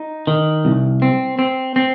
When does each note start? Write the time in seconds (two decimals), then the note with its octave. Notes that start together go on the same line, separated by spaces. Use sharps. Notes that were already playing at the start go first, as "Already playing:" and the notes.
Already playing: D#4
0.27 D#3
0.65 C2
1.02 C4
1.39 C4
1.76 C4